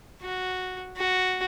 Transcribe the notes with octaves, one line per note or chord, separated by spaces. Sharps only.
F#4
F#4